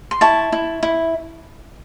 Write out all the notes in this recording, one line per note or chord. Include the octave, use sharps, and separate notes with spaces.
C6
E4 A5 C#6
E4
E4